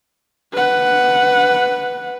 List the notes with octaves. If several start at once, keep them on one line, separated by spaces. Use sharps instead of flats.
B4 F#5